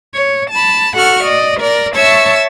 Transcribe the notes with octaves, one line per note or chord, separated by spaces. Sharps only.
C#5
A5 B5
F#4 A4 F#5 C#6 F6
D5 D#5
A#4 D5 A#6
C#5 E5 A5 C#6 E6